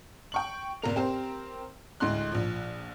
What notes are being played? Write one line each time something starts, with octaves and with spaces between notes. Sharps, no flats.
G5 C#6 F#7
F1 A#3 A#4 F7
C4 G4 A#4 C5
D2 A2 G#3 C6 F#6
A#1 F3